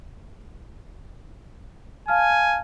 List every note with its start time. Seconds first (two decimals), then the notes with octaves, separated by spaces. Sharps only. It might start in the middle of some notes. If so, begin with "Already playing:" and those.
2.08 F5 G#5 A5 F6